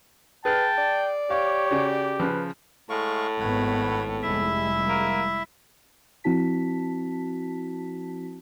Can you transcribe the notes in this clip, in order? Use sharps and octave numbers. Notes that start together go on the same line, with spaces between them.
G#4 B4 G5 A5 F6
D5
G4 C#5 F5
C#3 F#4
C#3 F3 B4
A2 G#3 F5 C#6
G#1 G#2 B3 C#5 F#5 B5
F1 G3 G#3 E4 E5
A#3
F3 C4 E4 F#4 A5 B6